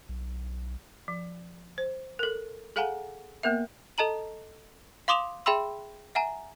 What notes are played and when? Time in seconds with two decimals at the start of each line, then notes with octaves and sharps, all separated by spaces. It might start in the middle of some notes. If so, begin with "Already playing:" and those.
0.09 B1
1.08 F3
1.78 C5
2.19 A4 A#4
2.76 G#4 A4 F5 F#5 G#5 A#5
3.43 A#3 B3 A#4 E5
3.98 A4 D#5 A5 A#5 F#7
5.08 F5 C6 D6 D#6 E7 F7
5.46 G#4 E5 G5 B5 C6 E6
6.15 E5 F#5 G#5 A#5